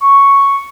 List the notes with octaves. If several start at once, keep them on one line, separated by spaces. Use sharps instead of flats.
C#6